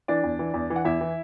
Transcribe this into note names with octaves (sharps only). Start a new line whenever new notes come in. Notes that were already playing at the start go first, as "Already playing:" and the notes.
E3 D4 D5
E2
E3
E2
E3
F#5
E2 E4 E5
E3